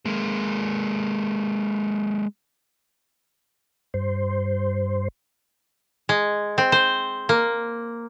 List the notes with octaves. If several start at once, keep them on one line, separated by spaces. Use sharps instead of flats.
G#3 A#3
G2 C5
G#3
C4
C5
A#3